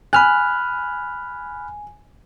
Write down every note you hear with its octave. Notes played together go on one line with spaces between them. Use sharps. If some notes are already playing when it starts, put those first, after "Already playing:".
G#5 B5 F6 F#6